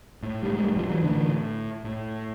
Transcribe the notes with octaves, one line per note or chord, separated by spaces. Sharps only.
A2
G3
G#3
G3 A3
F3 G3
E3 F#3
A2 D3 E3
A2